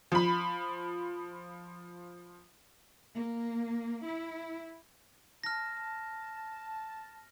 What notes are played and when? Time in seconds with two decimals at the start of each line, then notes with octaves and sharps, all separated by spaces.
0.12 F3 B5
3.16 A#3
4.06 E4
5.44 A5 F6 A#6